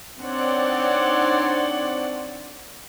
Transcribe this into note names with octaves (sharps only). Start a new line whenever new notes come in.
C4 D4 D#4 C#5 D5 F#5